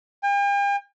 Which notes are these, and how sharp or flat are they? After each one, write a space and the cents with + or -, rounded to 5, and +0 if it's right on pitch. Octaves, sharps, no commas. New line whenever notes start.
G5 +45